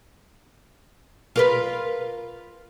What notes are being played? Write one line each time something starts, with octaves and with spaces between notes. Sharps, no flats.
F4 A#4 B4